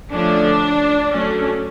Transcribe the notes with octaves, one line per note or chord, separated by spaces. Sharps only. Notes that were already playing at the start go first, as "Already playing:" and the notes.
D3 F3 A3 C#4 D4
F#3 A3 C#4